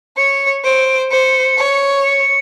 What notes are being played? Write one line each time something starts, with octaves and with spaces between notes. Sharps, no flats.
C#5 C#7
C5 D7
C5 C#7
C#5
C#7